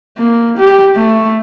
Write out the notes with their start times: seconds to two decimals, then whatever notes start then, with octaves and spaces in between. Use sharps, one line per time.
0.18 A#3
0.57 G4
0.96 A3